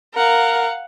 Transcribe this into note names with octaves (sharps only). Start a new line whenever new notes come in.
A#4 F5 F#5